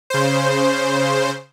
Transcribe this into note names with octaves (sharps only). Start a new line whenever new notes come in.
C#3 C5